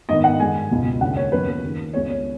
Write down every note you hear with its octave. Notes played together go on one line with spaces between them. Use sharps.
G#2 D#3 B3 D#5
F#5
G#2 D#3 G#3 G#5
C#2 B2 G#3
D#2 C#3 G#3 C#4 F#5
C#5
D#2 C#3 F#3 B3 B4
D#2 D#3 G#3
C#2 C#3 G#3 B3 C#5
C#5